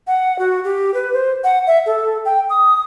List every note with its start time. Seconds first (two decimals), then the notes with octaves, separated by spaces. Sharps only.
0.07 F#5
0.39 F#4
0.64 G4
0.94 B4
1.14 C5
1.44 F#5
1.67 E5
1.86 A4
2.25 G5
2.50 D#6